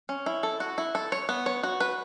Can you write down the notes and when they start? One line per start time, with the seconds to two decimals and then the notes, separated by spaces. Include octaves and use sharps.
0.09 C#4
0.26 E4
0.43 A4
0.60 F#4
0.78 E4
0.95 A4
1.12 C#5
1.29 B3
1.46 C#5
1.63 F#4
1.80 B4